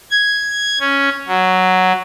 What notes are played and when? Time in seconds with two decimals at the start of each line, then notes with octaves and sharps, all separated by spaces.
0.11 G#6
0.80 C#4
1.28 F#3